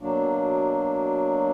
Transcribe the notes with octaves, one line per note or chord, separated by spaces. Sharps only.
B2 F#3 A#3 D4